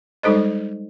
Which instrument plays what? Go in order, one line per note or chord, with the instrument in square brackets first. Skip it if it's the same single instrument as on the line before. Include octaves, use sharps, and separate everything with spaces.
[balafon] G3 G#3 D#4 A4 C5 D#5